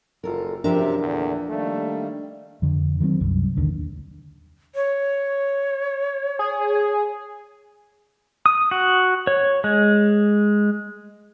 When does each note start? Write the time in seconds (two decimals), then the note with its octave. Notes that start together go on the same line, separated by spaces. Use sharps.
0.24 F#1 F4 A4 A#4
0.64 F#2 C3 F3 D4 G4 A#4 E5
0.99 E2 A#2 D3
1.49 D#3 G3 A3 A#3
2.62 F2 D3
3.00 D#3 F#3 A3 C4
3.21 C2 F#2
3.56 A1 D#2 D3
4.75 C#5
6.39 G#4
8.46 D#6
8.71 F#4
9.27 C#5
9.64 G#3